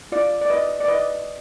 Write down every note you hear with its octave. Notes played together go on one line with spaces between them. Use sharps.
F4 D5
D5
B4 D#5
D5
B4 D#5